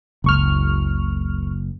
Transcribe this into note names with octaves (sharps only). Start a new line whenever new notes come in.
F#1 C#2 C#6 F6